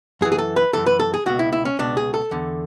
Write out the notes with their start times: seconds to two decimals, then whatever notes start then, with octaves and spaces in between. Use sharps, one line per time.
0.21 F#2 G#4
0.25 E3
0.32 G#4
0.38 A4
0.56 B4
0.73 F#2 E3 A4
0.86 B4
1.00 A4
1.14 G#4
1.26 C#2 B2 F#4
1.39 E4
1.53 E4
1.65 C#4
1.79 C#2 B2 D4
1.97 G#4
2.14 A4
2.31 E2 D3